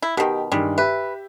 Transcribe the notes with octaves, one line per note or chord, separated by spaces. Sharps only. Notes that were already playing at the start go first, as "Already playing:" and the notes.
E4
B2 D#3 G4
G2 D#3 G3 G#3
G4 B4 E5